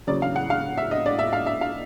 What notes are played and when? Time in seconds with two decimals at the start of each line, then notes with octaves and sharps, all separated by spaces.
0.07 E2 C#3 F#3 A#3 C#4 D5
0.22 F5
0.36 F#5
0.50 F5
0.78 E5
0.91 D#5
1.06 D5
1.19 E5
1.33 F5
1.46 E5
1.61 F5